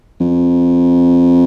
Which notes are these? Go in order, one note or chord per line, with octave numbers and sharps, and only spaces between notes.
F2